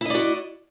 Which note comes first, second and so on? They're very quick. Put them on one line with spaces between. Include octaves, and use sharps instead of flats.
E4 D#5 D5 F#4